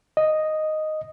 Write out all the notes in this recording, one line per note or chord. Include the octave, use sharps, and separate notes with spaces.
D#5